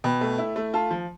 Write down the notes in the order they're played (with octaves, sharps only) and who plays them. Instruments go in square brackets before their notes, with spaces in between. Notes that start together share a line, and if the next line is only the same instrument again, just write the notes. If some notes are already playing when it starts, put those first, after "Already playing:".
[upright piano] B2 [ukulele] G5 B5
[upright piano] A3
E4
A3
[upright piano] F4 [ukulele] F5 A5
[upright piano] F3